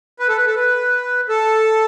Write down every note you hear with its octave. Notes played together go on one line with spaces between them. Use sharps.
B4
A4
B4
A4
B4
A4